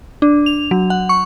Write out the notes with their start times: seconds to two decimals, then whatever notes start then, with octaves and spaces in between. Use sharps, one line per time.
0.22 D4
0.46 F7
0.71 F#3
0.90 F#5
1.09 C#6